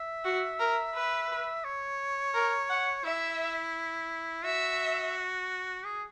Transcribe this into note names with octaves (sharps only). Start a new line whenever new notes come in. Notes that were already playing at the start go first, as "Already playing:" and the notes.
Already playing: E5
F#4
A#4
B4
C#5
A#4
F#5
E4 E5
F#4 E5
G#4